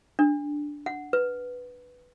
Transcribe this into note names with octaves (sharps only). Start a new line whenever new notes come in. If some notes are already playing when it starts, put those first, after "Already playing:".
D4
F#5
B4